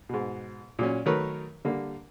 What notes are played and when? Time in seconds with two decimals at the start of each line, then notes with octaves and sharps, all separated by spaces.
0.09 G#2 B2
0.79 A#2 F#3 C#4
1.06 D#3 F#3 A3 A#4 B4 C#5
1.65 D3 G3 A#3